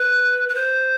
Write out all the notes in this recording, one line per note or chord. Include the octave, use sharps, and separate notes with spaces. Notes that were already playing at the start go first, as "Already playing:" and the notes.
Already playing: B4
B4
C5